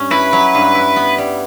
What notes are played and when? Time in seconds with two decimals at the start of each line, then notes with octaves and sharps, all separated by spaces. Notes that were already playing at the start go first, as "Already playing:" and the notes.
Already playing: G2 C#4
0.11 E4 B4
0.33 F#3
0.55 G2
0.75 E4
0.96 B3
1.18 G3